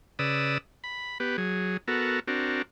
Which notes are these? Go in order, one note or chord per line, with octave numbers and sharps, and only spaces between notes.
C#3 B4 D5 D#6 E6
B5
B3 G4 B4
F#3 G#4
B3 F#4 A4 A#4
C4 D4 F#4 A#4